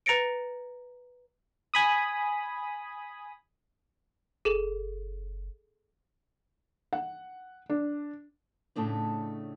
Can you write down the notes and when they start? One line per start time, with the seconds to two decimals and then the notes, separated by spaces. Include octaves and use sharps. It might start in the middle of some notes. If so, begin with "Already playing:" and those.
0.06 B4 A#5 A6 A#6 C#7 D7
1.74 G#5 B5 D#6
4.45 F#1 G#4 A4 F#7
6.93 F#5
7.70 D4
8.76 A2 C#3 A3 D4 D#4